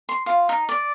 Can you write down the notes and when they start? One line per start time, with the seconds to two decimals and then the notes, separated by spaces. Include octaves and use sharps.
0.09 C6
0.26 F4
0.49 D#4
0.69 D5